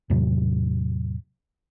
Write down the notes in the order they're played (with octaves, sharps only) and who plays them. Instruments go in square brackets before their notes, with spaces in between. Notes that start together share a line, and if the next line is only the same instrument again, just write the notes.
[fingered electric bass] E2 A2 C3 F#3